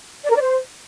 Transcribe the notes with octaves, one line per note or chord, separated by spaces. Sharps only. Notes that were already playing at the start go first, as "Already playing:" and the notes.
D5
A#4
D5
C5